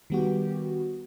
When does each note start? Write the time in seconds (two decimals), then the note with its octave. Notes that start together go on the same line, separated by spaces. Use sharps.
0.10 D#3 G3 B3 F#4 G4